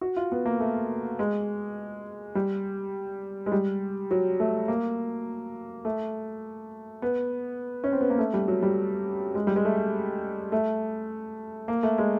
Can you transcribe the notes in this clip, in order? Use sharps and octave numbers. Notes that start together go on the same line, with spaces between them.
F#4
F4
B3
A#3
A3
G#3
G3
G#3
G3
F#3
A3
A#3
A3
B3
C#4
C4
B3
A#3
A3
G3
F#3
G3
G#3
G3
G#3
A3
A3
A#3
A3
G#3